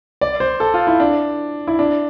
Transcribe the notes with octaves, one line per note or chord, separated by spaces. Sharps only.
D5
C5
A4
F4
E4
D4
E4
D4